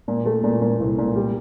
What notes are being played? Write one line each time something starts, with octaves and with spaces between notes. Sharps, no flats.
A#2
A3
A#2
A#2
C2
A#2
G3